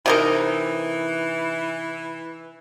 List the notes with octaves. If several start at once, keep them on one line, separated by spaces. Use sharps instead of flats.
C3 E3 D#4 A#4